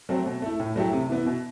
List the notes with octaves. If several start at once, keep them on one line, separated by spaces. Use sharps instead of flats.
F#3 A3 C4
B2
A3 E4
A2
F#3 A3 E4 G4
C3
E3 B3 E4
B2